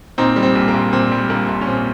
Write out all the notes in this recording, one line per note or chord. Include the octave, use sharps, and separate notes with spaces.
A#2 C4 D#4
G3
C4
A#1
A#3
A#1
A#2 C4
G3
A#1 A#3
A#1
C#4
A#2 C4